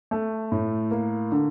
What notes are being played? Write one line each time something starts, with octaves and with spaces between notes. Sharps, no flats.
A3
A2
A#3
D3